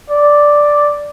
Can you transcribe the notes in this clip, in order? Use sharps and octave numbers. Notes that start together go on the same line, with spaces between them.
D5